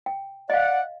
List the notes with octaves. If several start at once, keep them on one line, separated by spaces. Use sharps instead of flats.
G5
D5 D#5 F5 F#5